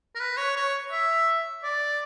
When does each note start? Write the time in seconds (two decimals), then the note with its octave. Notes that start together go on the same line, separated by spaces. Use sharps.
0.15 A#4
0.20 B4
0.37 C#5
0.56 C#5
0.91 E5
1.63 D5